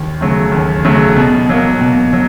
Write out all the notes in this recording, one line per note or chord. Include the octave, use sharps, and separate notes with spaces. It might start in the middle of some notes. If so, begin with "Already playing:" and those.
Already playing: D#2
C#3 F#3 A3
D#2
C#3 F#3 A3
B2
F#3 A#3
B2
F#3